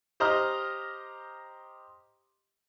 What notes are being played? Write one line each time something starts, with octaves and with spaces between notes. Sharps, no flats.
G4 C5 D#5 A#5 D#6 F6